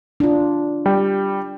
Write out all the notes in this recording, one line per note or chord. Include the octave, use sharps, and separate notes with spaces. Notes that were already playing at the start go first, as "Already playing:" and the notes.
D4 F4
G3 G5